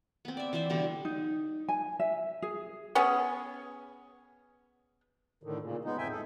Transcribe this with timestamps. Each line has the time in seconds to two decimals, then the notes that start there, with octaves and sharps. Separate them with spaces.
0.25 B3 C4
0.37 D5 E5
0.53 E3 C5 D5 E5
0.70 B2 D3 G3
1.05 D#4
1.69 G#5
2.00 E5
2.42 G#4
2.95 B3 C#4 G#4
5.43 A2 D3 D#3
5.62 A#2 C#3
5.85 G#3 B3 D#4
5.98 F2 A2 D#4 E5 G5 G#5
6.11 G#4 A4